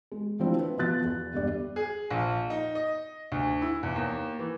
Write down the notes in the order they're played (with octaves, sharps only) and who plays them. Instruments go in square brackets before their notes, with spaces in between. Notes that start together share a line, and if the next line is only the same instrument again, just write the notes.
[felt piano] G#3
F3 A3 C4 D4 E4
B4
B2 F3 B3 F#6 A6
E2
G1 G3 D5
[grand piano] G#4
A#1
D#4
D#5
D2
E4
E2
D#2
E3